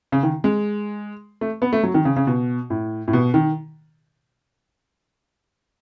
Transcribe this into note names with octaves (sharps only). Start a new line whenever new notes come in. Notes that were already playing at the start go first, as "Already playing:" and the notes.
C#3
D#3
G#3
A3
B3
A3
F#3
D#3
C#3
C#3
B2
A2
A2
B2
D#3